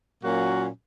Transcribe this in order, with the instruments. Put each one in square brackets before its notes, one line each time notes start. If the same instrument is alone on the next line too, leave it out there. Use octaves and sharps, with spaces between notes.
[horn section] A#2 F#3 A#3 C#4 F#4